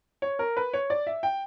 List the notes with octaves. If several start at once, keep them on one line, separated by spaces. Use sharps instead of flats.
C#5
A#4
B4
C#5
D5
E5
G5